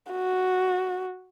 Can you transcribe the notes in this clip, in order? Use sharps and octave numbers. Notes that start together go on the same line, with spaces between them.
F#4